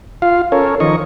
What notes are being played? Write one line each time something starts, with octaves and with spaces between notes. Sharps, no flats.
F4 F5
C#4 A4 A#4 C#5
D#3 F3 D#5 C#6